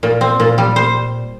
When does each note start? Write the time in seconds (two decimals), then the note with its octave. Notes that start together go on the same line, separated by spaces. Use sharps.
0.03 A#2
0.21 C4
0.40 A#2
0.58 G3
0.76 C5